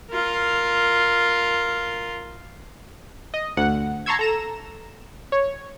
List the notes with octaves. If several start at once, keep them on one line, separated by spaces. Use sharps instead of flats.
F4 A#4
D#5
D2 F#5
A5 A#5 C6 C#6 E6 G#6
A4 A#5 E7
C#5